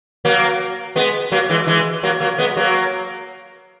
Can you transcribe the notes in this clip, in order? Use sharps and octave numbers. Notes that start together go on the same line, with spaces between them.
F#3 A#3
G#3 B3
F#3 A#3
E3 G#3
E3 G#3
F#3 A#3
F#3 A#3
G#3 B3
F#3 A#3